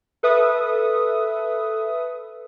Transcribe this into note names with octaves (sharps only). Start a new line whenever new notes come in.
A4 B4 E5 D#6